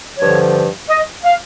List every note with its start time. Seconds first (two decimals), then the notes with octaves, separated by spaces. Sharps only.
0.19 G2 D3 F3 C#5
0.89 D#5
1.23 F5